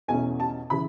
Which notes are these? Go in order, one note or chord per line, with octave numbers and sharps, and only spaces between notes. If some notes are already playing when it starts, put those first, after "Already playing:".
E2 B2 A3 C#4 G#5
A5
C#3 E3 B5